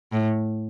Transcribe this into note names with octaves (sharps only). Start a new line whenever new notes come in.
A2